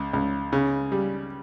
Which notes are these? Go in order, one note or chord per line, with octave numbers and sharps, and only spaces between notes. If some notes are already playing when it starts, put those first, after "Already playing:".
Already playing: C#2
C#2
C#3
G3